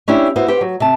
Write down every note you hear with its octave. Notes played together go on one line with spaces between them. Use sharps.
C#4 D4 E4 G4 E5
B3 E4 F#4 C5
G4 B4 C5
F#3
C3 A5